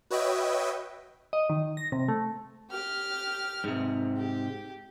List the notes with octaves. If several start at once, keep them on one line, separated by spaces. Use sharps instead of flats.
F#4 B4 C#5 D#5 E5 G5
D#5
D#3
A#6
C3
A3
G4 F6
G#2 C3
G4